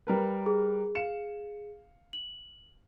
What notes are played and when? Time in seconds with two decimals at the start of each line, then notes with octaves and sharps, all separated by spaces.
0.07 G3 A#4 B4
0.46 G#4
0.95 F5 C#7 E7
2.13 F#7